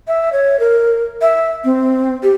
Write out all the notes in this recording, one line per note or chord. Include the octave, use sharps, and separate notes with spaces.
E5
C#5
A#4
E5
C4
G4